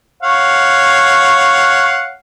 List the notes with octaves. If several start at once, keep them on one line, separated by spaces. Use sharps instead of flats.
C#5 F5 F#5